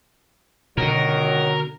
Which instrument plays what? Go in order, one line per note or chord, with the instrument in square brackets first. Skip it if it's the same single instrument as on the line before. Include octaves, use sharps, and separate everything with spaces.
[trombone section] C#2 D#3 F#3 [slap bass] B2 D3 [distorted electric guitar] A#4